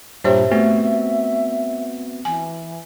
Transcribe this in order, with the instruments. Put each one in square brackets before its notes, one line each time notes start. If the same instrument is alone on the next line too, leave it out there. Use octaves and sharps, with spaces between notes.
[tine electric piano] G2 A#2 [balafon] G4 C5 C#5 [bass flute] E5
[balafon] A3 [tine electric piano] B3 C4 F#4
[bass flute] E3 [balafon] G#5